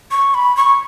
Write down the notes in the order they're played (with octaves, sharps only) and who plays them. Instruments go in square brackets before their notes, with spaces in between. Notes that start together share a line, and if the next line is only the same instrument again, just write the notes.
[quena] C#6
B5
C#6